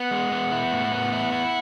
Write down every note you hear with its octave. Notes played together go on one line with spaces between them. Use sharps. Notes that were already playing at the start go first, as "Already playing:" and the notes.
Already playing: B3 F#5
G#3
B3
E4
A2
B3
E4
E4